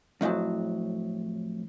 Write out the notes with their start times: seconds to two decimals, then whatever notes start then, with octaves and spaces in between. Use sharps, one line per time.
0.21 F2 A2 C#3 F3 F#3